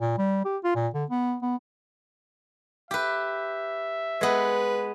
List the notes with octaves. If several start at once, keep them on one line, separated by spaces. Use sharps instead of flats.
A#2
G3
G4
F4
A#2
D3
B3
B3
G4 B4 E5
G#3 B3 B4